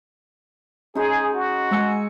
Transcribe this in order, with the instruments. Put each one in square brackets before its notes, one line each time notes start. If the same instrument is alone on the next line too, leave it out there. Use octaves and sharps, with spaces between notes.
[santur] G#3 D#4 [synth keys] C#4 [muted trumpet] G#4
[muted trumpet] F#4
[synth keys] G#3 E6 C#7 [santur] G#5 A#5